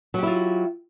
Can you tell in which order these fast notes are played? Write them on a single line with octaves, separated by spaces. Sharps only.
F#3 G4 E4 F4